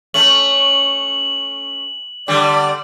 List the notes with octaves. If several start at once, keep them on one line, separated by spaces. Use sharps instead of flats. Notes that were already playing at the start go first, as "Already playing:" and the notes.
A3 C#4 F#7
D3 G3 D5